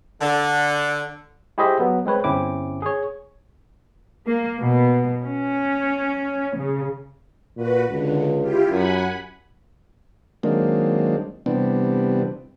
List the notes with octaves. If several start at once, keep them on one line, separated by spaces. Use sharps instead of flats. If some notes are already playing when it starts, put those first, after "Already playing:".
D3
E4 G4 G#4 C5 D#5 E5
F#3 B3
G#3 C4 B4 C#5
G1 C4 C#4 E4 D6
G#4 C#5
A#3
B2
C#4
C#3
A#2 F#4 B4
C#2 D3
E4 F4 G4
F#2 F#5 G#5 B5
D#3 F#3 G#3 A#3 C4 D4
C3 E3 G3 B3 C4 D4